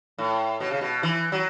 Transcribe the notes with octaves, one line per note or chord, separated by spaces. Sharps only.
A2
B2
C#3
B2
E3
F#3